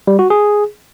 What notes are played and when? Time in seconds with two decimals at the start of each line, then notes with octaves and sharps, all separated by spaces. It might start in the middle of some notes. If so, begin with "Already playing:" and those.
0.07 G3
0.19 F#4
0.30 G#4